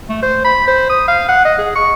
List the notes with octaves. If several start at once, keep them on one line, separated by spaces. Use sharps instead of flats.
A3
C5
B5
C5
D#6
F5
F#5
D#5
G#4
C#6